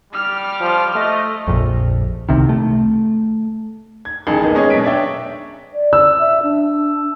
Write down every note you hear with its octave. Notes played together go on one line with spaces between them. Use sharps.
G3 D6 F6
F3
A3 D#5
A#1 F2
C2 C3 D#3
A3
G#6
A1 D#3 G#4 A5
D#1 A#3 B3 D#4
G#3 B3 C#4 G#4 C#5 D#5
B2 F#3 B6 D7
D4 C#5 D5 E5 G5
D5
E6
E5
D4